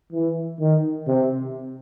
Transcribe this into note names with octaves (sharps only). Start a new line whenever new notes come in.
E3
D#3
C3